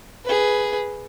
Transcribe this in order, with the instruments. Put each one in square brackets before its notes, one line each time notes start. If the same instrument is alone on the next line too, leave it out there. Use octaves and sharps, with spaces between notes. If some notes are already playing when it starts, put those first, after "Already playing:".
[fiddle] G#4 B4